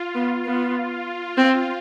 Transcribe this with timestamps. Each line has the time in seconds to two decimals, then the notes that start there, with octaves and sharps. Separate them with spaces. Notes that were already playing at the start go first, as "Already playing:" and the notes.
Already playing: F4
0.15 B3
0.45 B3
0.76 F4
1.37 C4